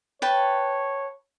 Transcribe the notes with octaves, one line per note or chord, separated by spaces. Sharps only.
B4 C#5 G5 A5